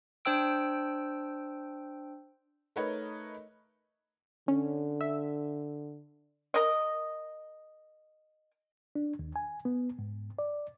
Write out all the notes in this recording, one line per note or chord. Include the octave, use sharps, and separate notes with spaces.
D4 C5 G5 E6 D7
A3 D#4 A#4 B4 C#5 D#5
D3 C#4
E5
A#4 D#5
D4
D#2
G#5
B3
G#2
D5